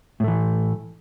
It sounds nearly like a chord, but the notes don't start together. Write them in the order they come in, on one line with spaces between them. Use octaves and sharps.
A2 A3 E3